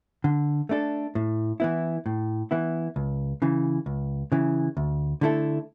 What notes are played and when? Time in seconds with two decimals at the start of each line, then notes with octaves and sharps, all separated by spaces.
0.24 D3
0.69 A3 D4 A4
1.15 A2
1.60 E3 B3 E4
2.06 A2
2.51 E3 B3 E4
2.96 C#2
3.42 C#3 E3
3.86 C#2
4.32 C#3 E3
4.77 D2
5.21 D3 A3 E4 A4